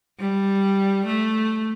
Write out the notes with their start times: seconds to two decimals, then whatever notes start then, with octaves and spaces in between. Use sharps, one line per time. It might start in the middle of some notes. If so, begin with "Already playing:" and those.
0.20 G3
1.06 A3